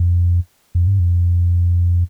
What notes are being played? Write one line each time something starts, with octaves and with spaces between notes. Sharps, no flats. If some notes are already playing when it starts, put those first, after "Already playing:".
Already playing: F2
F2
G2
F2